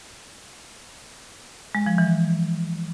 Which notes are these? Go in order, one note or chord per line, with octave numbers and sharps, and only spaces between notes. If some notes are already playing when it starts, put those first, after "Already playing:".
G#3
F3
E3